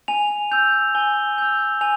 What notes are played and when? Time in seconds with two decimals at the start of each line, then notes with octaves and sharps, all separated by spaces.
0.08 G#5 F7
0.51 E6 G6 F7
0.95 G#5 G7
1.38 E6 G6 F7
1.81 G#5 F7